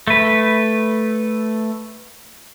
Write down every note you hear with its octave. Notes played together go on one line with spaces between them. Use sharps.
A3 B4